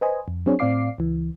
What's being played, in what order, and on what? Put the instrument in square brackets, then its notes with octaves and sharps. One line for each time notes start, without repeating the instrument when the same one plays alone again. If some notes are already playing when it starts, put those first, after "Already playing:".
[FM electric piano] B4 C5 D#5 G#5
F2
F#3 C4 D4 G#4 C#5
A2 C4 D5 F5 D6 C7
C#2 E3